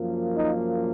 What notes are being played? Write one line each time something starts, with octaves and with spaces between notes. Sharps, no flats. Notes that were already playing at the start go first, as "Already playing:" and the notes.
Already playing: F#2 F3 A#3
D#4